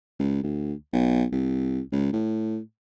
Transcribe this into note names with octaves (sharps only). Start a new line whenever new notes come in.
C#2
D2
B1
C2
C#2
A2